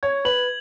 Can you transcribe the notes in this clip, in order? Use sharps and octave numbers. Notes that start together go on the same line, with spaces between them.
C#5 G#6
B4 F#7